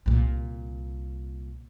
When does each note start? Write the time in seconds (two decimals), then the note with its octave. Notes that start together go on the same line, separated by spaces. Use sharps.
0.06 C2 A#2